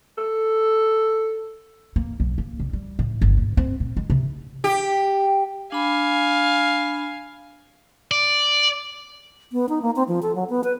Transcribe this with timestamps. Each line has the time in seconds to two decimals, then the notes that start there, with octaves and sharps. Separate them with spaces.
0.18 A4
1.96 A#3
2.20 B1
2.38 A#3
2.60 F1
2.73 G3
2.99 A2
3.21 G1
3.37 A#2
3.57 C4
3.80 A#2
3.97 G#3
4.10 C3
4.64 G4
5.72 D4 F5 G#5 B5
8.11 D5
9.52 B3
9.69 D#4
9.82 A#3
9.96 C4
10.08 F3
10.22 A4
10.35 F#3
10.50 B3
10.64 B4